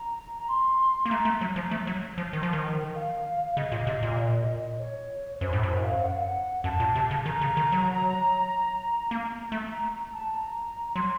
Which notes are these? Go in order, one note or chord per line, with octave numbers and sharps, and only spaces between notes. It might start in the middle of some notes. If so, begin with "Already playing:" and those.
Already playing: A#5
A#5
C6
A#3
A3 A#5
A3
F#3
F3
A3
F#3
F3
D#3
F3
D#3
F5
C#3 D#5
A#2
C3
A#2
C#5
F#2 C5
A2
F#2 C5
F5
F#5
F5
F#5
F#2 A5
A#2
C3
C#3
D#3 A#5
C#3
D#3
F#3
A#3
A3
A#5
A#5
A5
A#5
A#5
F#3 C6